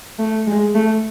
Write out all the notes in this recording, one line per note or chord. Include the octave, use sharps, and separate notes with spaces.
A3
G#3
A3